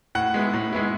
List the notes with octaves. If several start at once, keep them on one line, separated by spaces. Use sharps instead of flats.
A2 F#5
G#3 B3 E4
A2
G#3 B3 E4